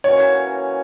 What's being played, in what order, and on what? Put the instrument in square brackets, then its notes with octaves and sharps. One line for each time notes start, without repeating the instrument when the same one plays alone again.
[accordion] E3 A#3 C#4 F#4 [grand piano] C#5